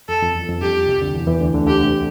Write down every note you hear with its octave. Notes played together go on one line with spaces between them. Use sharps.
F2 A4
F2
E2
F2
G2 G4
C2 C3
D2 D3
E2 E3
E2 E3
D2 D3
D2 D3
D2 D3 G4
C2 C3